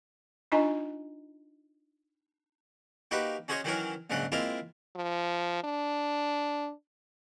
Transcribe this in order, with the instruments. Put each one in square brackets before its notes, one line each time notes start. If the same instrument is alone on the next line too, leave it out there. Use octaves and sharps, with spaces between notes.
[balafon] D4 D#4 F4 D#5 G#5 A#5
[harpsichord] A#3 D#4 F#4 G4 B4
C#4 F#4 G#4 C5 C#5 D#5
D#3 E3 F#3 C#4 F#4 A#4
A#1 G#2 C#3 F#3 F#5
G#3 A#3 C4 E4 F4 A#4
[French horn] F3
D4